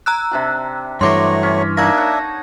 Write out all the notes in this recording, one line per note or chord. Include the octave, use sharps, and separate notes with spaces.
A#5 E6 F#6
C3 D4 G4
G2 E3 F#3 A3 C#5 C6 D6 A#6
C#4
A#3 D4 D#4 D5 E5 G#6 A#6
C#5 F#5 A5